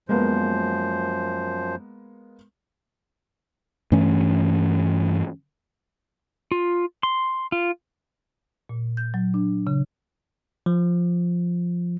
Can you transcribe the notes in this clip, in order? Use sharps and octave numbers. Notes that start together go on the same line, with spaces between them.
F#2 F3 G#3 A#3 B3 C5
G2 E3 A3 C#4
F4
C6
F4
A#2
G6
F#3
D4
C#3
F3